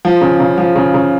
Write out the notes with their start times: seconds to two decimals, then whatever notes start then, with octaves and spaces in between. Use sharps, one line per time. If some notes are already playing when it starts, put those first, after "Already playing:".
0.05 F3
0.21 C#3
0.40 C#3
0.58 F3
0.76 C#3
0.94 C#3